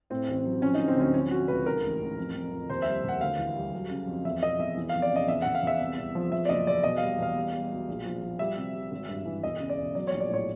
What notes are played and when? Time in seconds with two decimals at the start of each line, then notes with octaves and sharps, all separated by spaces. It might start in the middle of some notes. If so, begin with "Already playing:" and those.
0.10 A2 C4
0.28 A1
0.45 F#3
0.62 F3 C#4
0.75 D#4
0.80 D3
0.88 C4
0.96 D2 C#4
1.14 F3 C#4
1.31 F3 F#4
1.48 C#2 B4
1.66 D#3 A#4
1.83 A1
2.01 A1
2.18 F2
2.35 F2
2.52 F2
2.70 D#2 C5
2.82 G3 E5
3.04 D#2 F#5
3.21 D2 F5
3.39 E3
3.56 G3
3.73 F#3
3.90 C#3
4.07 F2
4.25 E2 E5
4.43 E1 D#5
4.59 E2 E5
4.77 E3
4.89 F2 F5
5.02 D5
5.12 C#3 D#5
5.28 E2 E5
5.42 E2 F#5
5.55 F5
5.63 E2 E5
5.81 C2
5.98 C2
6.15 F3
6.32 E2 E5
6.45 D5
6.49 F#1 D#5
6.67 E2 D5
6.83 B2 D#5
6.97 G3 F5
7.19 E2 F5
7.36 G3
7.53 G3
7.71 B1
7.88 A#1
8.05 F3
8.22 F3
8.39 G3 E5
8.57 C3
8.74 G3
8.91 G#1
9.09 G2
9.26 E3
9.43 E1 D#5
9.60 C#3
9.69 D5
9.78 E1
9.95 F#3 D5
10.07 C#5
10.13 A#1
10.20 D5
10.30 A2 C#5